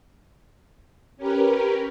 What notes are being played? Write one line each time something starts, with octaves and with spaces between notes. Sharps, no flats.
C#4 G4 A#4 B4